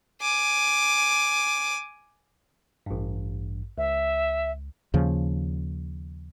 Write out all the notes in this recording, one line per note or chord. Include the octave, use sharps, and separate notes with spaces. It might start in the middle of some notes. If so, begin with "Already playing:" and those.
G#5 D6
A1 G2
C#2 E5
D#2 C#3 F3